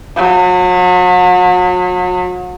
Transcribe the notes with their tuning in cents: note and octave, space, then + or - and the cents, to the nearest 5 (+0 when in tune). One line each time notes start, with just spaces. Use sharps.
F#3 -40